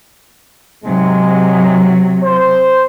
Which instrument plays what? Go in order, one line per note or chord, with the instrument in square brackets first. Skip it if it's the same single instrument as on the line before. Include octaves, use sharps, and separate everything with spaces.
[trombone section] G#2 G#3 [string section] C3 F#3
[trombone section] C5